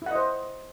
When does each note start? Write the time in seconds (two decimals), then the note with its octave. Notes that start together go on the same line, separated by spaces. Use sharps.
0.02 E4
0.06 F#5
0.11 D#5
0.15 C5